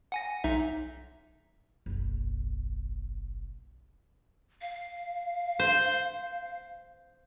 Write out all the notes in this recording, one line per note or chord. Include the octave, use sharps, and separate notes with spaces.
F#5 G#5 A#6
B1 D#4 E5
F#1 B1
F5
C5